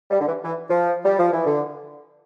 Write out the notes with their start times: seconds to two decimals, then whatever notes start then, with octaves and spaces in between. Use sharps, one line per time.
0.11 G3
0.21 D3
0.26 E3
0.44 E3
0.69 F3
1.05 G3
1.18 F3
1.32 E3
1.46 D3